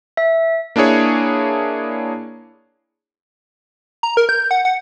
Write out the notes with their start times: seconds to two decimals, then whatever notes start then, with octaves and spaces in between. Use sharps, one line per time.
0.17 E5
0.76 A#3 D4 E4 G#4 C#5
4.03 A#5
4.17 A#4
4.29 G6
4.51 F#5
4.65 F#5